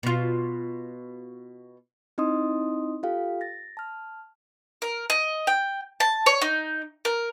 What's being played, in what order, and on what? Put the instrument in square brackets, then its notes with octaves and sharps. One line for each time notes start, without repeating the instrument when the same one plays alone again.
[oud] B2 F4
[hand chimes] C4 D#4 E4 D#5 C6 D#6
F4 G4 A4 F5 G5
A6 A#6
A5 F6
[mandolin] A#4
D#5
G5
A5
C#5
D#4
A#4